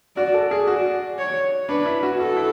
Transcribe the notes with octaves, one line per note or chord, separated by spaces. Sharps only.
F#4 D5
A4
G#4
F#4 D5
C#5
D4 B4
E4
F#4
F#4 A4
E4